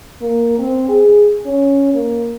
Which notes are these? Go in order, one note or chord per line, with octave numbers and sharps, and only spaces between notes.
A#3
C4
G#4
C#4
A#3